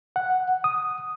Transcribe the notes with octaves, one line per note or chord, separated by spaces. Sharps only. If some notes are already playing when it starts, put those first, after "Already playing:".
F#5
D#6